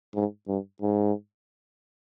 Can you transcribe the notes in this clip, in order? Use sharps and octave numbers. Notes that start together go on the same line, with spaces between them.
G#2
G2
G#2